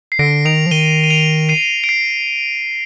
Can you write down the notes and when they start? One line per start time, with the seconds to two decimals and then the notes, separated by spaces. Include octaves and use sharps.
0.12 C7
0.19 D3 A#6 D7
0.45 D#3 D7 F7
0.66 F3
0.71 D#3 D#7 G7
1.04 D#7
1.10 D7 F7
1.49 C7 D#7
1.84 D7
1.89 C7